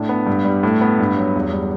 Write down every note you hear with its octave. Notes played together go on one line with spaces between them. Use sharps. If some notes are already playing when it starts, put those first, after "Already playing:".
Already playing: A2 D4
B3
G2
G3
A2
B3
G2
F#3
E2
G3